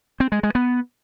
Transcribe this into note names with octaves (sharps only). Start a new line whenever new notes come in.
C4
G#3
G#3
B3